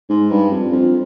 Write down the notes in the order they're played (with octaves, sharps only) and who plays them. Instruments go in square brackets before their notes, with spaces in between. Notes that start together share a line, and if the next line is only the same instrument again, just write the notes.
[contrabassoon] G#2
G2
F2
F2